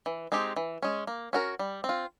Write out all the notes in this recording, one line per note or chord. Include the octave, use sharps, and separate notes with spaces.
E3
G#3 C4 D#4 G4
E3
G#3 C#4
A#3
C#4 F#4 A#4
G3
C4
F4